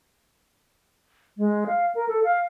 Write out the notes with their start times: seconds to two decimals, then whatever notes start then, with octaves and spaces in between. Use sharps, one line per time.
1.38 G#3
1.67 F5
1.95 A#4
2.09 A4
2.24 F5